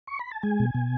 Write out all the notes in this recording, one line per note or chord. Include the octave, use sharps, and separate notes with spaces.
C#6
B5
A5
G#3 G#5
B2
B2